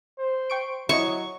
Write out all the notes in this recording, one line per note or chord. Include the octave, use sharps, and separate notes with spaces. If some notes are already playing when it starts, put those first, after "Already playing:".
C5
G5 C#6 D7
F#3 E4 C#5 D#5 C#6